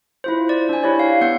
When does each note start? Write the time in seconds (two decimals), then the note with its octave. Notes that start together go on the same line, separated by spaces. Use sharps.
0.24 E4 F4 C5
0.49 D5
0.69 D4 G#5
0.83 E4 G4 C#5 D5
0.99 F5
1.21 B3 F5 F#5 G6